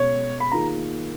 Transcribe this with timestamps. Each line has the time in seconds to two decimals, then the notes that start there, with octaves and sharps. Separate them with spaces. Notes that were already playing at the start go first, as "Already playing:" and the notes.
Already playing: B2 G#3 C#4 C#5
0.40 B5
0.52 D#3 A#3 F4 G#4 A#5